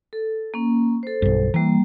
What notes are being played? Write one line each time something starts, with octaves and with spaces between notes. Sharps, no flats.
A4
A#3 C#4
A4 C5
B1 G2
E3 G3 A#3